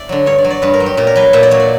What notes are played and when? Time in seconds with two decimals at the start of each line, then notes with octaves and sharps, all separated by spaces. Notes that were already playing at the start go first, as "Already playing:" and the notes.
Already playing: D5 E5
0.09 D3 F#3
0.26 G2 C#5
0.38 D5
0.44 F#3
0.50 D5
0.62 G2 B4
0.74 A#4
0.80 F#3
0.86 G4
0.97 A#2 G4
1.07 A#4
1.16 F#3 B4
1.33 A#2 E5
1.43 D5
1.51 F#3 C#5
1.60 D5